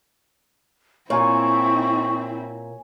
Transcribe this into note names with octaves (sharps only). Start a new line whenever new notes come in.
A#2 C4 E4 C#5 G#5 C#6